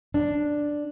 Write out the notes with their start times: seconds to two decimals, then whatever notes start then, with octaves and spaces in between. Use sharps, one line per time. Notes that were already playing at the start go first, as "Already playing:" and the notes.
0.14 D4